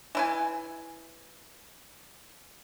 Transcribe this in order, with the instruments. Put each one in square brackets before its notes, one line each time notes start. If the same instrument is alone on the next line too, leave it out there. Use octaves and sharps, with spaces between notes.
[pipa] E3 E4 G#5